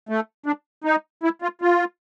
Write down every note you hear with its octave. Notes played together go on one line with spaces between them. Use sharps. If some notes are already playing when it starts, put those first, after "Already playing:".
A3
D4
D#4
E4
F4
F4